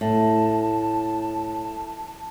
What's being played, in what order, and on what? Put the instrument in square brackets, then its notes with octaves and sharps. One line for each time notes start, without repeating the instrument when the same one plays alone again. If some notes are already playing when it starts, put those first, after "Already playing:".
[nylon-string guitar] A2 [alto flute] A5